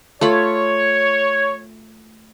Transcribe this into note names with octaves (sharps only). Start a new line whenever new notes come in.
A3 F4 C#5 B5